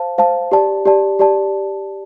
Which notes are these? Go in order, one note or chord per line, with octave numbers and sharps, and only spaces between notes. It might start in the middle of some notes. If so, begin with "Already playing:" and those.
Already playing: C5 F5 A5
C5 F5 A5
G4 D5 A5
G4 D5 A5
G4 D5 A5